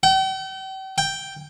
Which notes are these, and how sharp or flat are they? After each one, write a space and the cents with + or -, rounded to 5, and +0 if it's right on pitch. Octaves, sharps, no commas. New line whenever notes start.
G5 -40
G5 +0